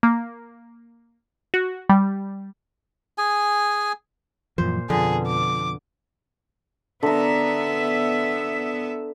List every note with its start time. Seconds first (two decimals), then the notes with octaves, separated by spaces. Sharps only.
0.03 A#3
1.54 F#4
1.89 G3
3.18 G#4 G#5
4.58 F#2 A#2 E3 F3 C5
4.90 F2 B2 D3 F3 G#4
5.28 D6
7.03 D3 B3 E5 A#5